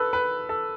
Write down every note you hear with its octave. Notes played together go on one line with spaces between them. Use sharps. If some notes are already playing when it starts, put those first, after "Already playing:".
Already playing: A4 B4
B4
A4